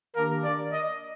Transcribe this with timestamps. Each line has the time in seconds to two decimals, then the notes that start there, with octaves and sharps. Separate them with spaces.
0.16 D#3 A#3 D4 G4 A#4
0.44 D5
0.73 D#5